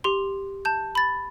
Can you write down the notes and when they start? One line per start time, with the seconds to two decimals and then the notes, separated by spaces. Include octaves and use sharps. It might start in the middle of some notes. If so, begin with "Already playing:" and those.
0.04 G4 C6
0.65 A5 G6
0.95 B5 A6